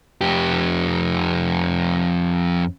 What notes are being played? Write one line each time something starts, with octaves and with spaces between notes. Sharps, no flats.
F2 G4